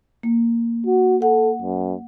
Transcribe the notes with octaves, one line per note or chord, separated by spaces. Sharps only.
A#3
F#4
A4 F#5
F#2